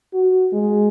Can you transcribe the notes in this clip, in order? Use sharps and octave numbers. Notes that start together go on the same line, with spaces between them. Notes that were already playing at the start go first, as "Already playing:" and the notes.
F#4
G#3